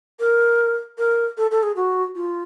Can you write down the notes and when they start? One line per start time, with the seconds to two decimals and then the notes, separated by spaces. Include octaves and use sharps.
0.20 A#4
0.98 A#4
1.38 A4
1.51 A4
1.63 G#4
1.76 F#4
2.16 F4